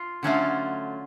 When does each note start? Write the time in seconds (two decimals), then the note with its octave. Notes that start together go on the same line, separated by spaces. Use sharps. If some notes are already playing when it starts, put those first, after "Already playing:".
Already playing: F4
0.23 D3 F#3 A3 C#4 F4